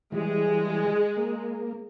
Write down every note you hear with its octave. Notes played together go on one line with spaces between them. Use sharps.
E3 G3 G#3
A#3